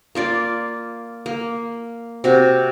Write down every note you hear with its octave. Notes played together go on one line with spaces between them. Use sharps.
A#3 F4 D5
A#3
C3 F#4